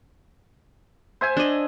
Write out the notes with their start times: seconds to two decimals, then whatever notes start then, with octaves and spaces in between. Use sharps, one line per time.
1.21 C5 E5 G#5
1.37 D4 D#5